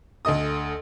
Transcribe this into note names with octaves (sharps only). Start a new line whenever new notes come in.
D2 A4 D#5 D#6